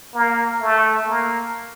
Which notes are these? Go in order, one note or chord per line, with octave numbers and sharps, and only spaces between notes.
A#3
A3
A#3